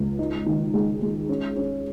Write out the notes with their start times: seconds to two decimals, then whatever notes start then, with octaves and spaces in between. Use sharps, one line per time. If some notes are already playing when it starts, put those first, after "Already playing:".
Already playing: C#2
0.19 D#4
0.46 D#3
0.74 G#3
1.02 G#3
1.29 C#4
1.56 C#4